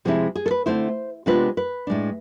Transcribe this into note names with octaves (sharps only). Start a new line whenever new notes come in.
C3 F3 G#3 C4 E4 G#4
G#4
A4
B4
D3 A3 C4 E4 C5
C3 G#3 B3 D4 F4 B4
B4
A2 G#3 D4